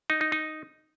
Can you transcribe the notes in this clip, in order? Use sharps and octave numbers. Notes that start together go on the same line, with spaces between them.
D#4
D#4
D#4